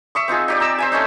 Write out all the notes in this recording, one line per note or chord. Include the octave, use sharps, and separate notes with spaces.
E5 C#6 D#6
C4 D#4 F4 G#4
D#4 G4 D5
A#5 E6
C5 E5 G#5
A3 C#4 D#4